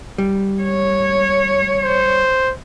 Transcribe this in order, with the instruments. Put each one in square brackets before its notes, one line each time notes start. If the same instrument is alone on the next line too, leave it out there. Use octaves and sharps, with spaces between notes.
[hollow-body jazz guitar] G3
[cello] C#5
[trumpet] C5